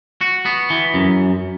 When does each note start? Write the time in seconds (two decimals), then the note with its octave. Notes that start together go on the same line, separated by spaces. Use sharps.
0.21 F#4
0.46 B3
0.70 E3
0.94 F#2